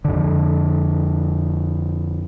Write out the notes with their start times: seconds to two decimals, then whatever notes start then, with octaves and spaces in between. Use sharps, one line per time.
0.05 F2 D3